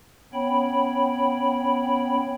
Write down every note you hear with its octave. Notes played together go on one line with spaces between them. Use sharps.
B3 C#4 C#5 G5 B5